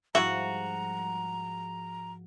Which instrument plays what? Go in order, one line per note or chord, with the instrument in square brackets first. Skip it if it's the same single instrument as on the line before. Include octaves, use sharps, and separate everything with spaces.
[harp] G#2 F3 G3 [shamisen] E4 E5 [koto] F#4 [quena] A#5